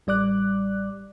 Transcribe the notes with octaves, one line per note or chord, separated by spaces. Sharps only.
A1 G3 D5 D6 F#6